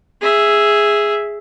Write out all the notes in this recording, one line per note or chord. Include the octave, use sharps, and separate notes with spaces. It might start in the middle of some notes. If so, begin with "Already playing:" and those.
G#4 E5